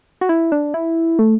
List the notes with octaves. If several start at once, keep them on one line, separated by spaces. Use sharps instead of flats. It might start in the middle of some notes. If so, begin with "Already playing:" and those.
F#4
E4
D4
E4
A3